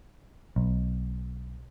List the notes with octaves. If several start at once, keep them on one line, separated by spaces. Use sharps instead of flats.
B1